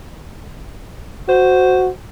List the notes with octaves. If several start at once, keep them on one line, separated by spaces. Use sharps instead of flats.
F#4 C5